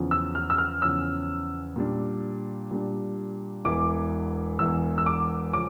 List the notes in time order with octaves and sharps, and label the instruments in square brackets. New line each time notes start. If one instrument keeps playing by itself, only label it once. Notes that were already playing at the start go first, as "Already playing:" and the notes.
Already playing: [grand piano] E2 C#3 F3 C#4
[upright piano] E6
F6
E6
F6
[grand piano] E2 C#3 F3 C#4 [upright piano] E6
[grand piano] A#2 G3 D4
A#2 G3 D4
[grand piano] E1 E2 E3 [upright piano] D6
[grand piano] E1 E2 E3 [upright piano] E6
[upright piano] E6
D6
[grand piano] C#3 F3 C#4 [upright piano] D6